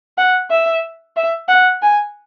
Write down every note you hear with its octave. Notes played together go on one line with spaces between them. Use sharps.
F#5
E5
E5
F#5
G#5